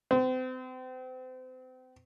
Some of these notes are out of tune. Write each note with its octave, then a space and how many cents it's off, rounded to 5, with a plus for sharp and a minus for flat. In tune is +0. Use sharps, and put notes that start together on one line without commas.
C4 -35